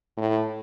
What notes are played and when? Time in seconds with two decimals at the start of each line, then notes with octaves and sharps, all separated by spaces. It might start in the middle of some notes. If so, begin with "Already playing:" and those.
0.17 A2